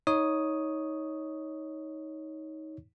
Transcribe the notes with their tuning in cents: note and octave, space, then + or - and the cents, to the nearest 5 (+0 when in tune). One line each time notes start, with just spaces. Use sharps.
D#4 +20 C#5 +0 D#6 +0